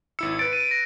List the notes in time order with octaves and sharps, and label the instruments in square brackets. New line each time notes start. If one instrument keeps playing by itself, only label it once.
[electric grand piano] G#1 E4 E6 [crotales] C#7
[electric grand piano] B4 A6 [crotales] D7
[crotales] D#7
A#6